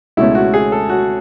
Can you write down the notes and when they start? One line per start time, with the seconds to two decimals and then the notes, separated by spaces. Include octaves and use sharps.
0.17 C#2 B2 A3 C#4 E4
0.35 F#4
0.54 G#4
0.72 A4
0.90 F#4